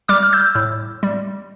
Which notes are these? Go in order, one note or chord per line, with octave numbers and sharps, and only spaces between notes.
G3 D6 F6
F6
E6 G6
A2
G3